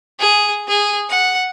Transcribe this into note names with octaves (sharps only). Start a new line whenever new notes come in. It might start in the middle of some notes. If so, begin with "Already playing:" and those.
G#4
G#4
F#5